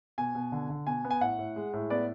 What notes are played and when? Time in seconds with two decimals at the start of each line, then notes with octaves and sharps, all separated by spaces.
0.18 B2 G#5
0.35 B2
0.52 D3
0.70 D3
0.87 B2 G#5
1.05 B3
1.11 G#5
1.21 A2 F#5
1.39 A2
1.56 G#3
1.73 A2
1.90 B3 D5